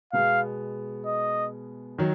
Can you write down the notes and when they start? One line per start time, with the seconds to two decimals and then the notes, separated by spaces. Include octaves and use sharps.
0.13 B2 G#3 B3 F5
1.06 D#5
1.98 D#3 F#3